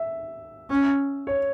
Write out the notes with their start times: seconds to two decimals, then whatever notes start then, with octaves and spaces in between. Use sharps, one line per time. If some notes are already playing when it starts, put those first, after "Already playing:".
Already playing: E5
0.70 C#4
1.27 C#5